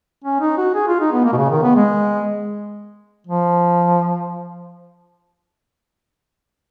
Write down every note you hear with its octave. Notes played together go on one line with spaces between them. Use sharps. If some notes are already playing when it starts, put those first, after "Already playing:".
C#4
D#4
F#4
G#4
F4
D#4
B3
A#3
B2
C#3
D#3
B3
G#3
F3